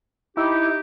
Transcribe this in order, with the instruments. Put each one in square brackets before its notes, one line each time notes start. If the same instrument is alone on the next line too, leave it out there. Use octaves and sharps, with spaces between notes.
[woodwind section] D#4 G4 [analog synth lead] E4